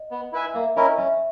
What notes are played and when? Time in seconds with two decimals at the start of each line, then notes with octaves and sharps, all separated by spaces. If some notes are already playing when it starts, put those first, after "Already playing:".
Already playing: D#5
0.11 B3
0.33 E4 B4 E5 G#5
0.54 A#3 E5
0.76 C#4 E4 A#4 D#5
0.98 C#4 E5